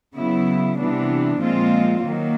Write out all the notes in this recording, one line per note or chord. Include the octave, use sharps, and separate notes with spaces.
C#3 F#3 B3 E4
C3 E3 G3 B3 D4
A#2 F3 G#3 C4 F4
D#3 F#3 A#3